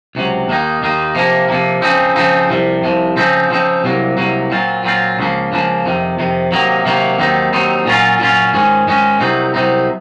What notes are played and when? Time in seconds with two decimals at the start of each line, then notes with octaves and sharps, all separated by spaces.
0.15 C#2 C3 F#3
0.48 D#2 D#3 A#3 D#4
0.82 D#2 D#3 A#3 D#4
1.15 C3 F3 A#3
1.48 C3 F3 A#3
1.82 C#3 F3 C4 D#4
2.16 C#3 F3 C4 D#4
2.49 C2 C3 F3
2.83 C2 C3 F3
3.17 C#3 F3 C4 D#4
3.50 C#3 F3 C4 D#4
3.84 C2 C3 F#3 A#3
4.17 C2 C3 F#3 A#3
4.51 A#2 F#3 C4 F4
4.84 A#2 F#3 C4 F4
5.17 C#2 C#3 F3 A#3
5.52 C#2 C#3 F3 A#3
5.85 F2 C3 D#3
6.19 F2 C3 D#3
6.52 C3 D#3 F#3 A#3
6.86 C3 D#3 F#3 A#3
7.19 D#2 D#3 F#3 C4 D#4
7.53 D#2 D#3 F#3 C4 D#4
7.86 A#2 F#3 C#4 F4
8.20 A#2 F#3 C#4 F4
8.54 G#2 D#3 G#3 C#4
8.87 G#2 D#3 G#3 C#4
9.20 C2 C3 F#3 C4 D#4
9.54 C2 C3 F#3 C4 D#4